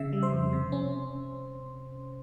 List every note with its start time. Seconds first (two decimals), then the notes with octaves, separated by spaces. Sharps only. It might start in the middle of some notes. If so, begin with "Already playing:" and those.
Already playing: C#3 E5 E6
0.13 G3
0.23 C5 C6
0.32 F2
0.53 C3
0.72 C#4